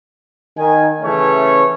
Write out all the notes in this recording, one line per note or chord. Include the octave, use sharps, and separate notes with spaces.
D#3 G#5
C#3 E3 A3 C#4 C#5